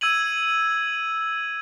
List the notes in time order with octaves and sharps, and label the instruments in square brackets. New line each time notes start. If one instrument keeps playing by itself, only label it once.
[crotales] E6 G#6 D#7 F#7